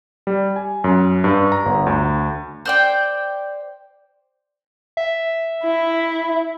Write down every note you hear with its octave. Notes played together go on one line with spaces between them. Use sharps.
G3
G#5
F#2
G2
A#5
G1
D2
C5 D5 G5
E5
E4